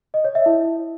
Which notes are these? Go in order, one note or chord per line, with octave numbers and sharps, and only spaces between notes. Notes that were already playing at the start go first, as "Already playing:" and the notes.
D#5
C#5
E5
E4